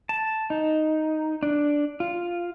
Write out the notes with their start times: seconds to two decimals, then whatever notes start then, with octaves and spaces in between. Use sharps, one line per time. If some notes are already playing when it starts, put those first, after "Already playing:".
0.09 A5
0.50 D#4
1.43 D4
2.00 F4